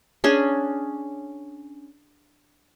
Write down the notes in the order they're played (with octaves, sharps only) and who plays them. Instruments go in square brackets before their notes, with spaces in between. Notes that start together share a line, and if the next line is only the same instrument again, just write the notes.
[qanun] C#4 D4 G#4